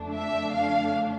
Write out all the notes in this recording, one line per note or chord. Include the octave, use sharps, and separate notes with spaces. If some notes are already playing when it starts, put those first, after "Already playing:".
Already playing: F2 D3 A3 D4
E5
F5